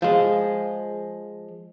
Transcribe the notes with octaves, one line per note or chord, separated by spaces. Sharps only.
F3 G#3